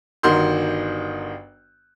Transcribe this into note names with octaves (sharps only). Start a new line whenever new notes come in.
G1 D#3 F#4 C6 G6